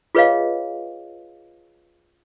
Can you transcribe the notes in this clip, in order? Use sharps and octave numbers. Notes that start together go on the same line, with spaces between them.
F4 G#4 B4 C#5 D#5 F5